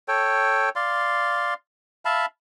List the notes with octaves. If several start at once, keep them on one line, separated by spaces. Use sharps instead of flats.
A4 C#5 G5
D5 F5 C6
E5 F5 A5 B5